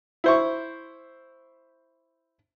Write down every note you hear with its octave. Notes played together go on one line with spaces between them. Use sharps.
E4 C5 C#6